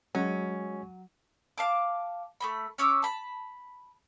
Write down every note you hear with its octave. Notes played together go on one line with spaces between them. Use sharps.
F#3 G#3 C#4 F#4
F5 A5 D6
A3 A#3 B5
C#4 C#5 D6 E6
A5 B5